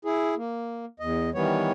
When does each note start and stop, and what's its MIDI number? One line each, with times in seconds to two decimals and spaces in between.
0.05 0.35 64
0.05 0.35 68
0.37 0.85 58
1.00 1.30 40
1.00 1.30 75
1.34 1.72 51
1.34 1.72 52
1.34 1.72 55
1.34 1.72 59
1.34 1.72 73